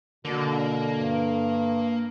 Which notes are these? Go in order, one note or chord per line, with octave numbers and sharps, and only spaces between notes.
B2 D3 A#3
G2